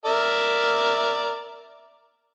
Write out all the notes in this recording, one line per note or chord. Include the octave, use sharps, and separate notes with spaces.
A#4 D5 E5